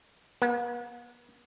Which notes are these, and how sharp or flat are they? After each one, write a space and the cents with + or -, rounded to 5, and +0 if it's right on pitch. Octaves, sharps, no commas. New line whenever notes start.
B3 -45